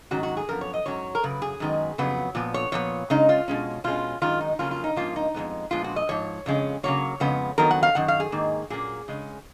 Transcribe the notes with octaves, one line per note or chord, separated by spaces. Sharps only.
G#2 D#3 F#3 C#4 F#4
F#4
G#4
F#2 F3 B3 A#4
C#5
D#5
G#2 F#3 C#4 C#5
A#4
F#2 C#3 B4
G#4
F#2 D#3 G#3 B3
F2 C#3 F#3 B3
A#2 F3 B3
C#5
A#2 F3 B3 C#5
C#3 G#3 C#4 D#4
F4
B2 G#3 C#4
B2 G#3 C#4 F4
F#2 D#3 G#3 F4
D#4
F2 C#3 F#3 A#3 C#4 F4
F4
D#4
G#2 F3 A#3 C#4 F4
D#4
F2 C#3 G#3 B3
A#2 F3 G#3 B3 F4
F#4
D#5
G#2 F3 C#5
F2 C#3 G#3 C#4
C#3 F#3 A#3 C#5
F2 C#3 G#3 B3
F2 D#3 F#3 B3 A#4
F#5
F5
F#2 D#3 F#5
F5
G#4
G#2 D#3 A#3
A#2 F#3 A#3 C#4 G#4
C#3 G#3 C#4